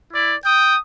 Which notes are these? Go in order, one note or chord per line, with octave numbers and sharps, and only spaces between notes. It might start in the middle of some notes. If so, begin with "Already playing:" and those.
E4 D5
G5 D#6